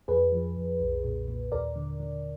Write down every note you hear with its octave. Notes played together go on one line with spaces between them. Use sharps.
F2 G#4 B4
F3
F2
B1
A#2
A#2
D#2 A#4 D5
D3
D3